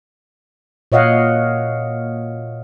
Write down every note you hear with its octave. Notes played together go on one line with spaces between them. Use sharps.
A#2 C#5 D#5 F5 F#5